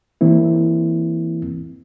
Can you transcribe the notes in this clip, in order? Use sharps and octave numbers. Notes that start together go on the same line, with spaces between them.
E3 A#3 C4 E4